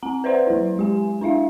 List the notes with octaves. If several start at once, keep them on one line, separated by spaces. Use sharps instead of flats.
C4 F#5 A#5
B4 C5 D5 E5 F#5 C6
F#3 E4
G#3 G4 G#5
D4 E4 E5 F5